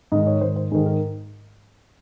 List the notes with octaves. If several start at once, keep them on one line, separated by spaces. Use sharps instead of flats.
G#2 D#3 D#5
C#5
G#2 D#3 C5
C5
G#2 D#3 G#4
A#4